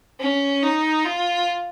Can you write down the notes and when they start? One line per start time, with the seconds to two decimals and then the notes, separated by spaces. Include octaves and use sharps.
0.20 C#4
0.63 D#4
1.04 F4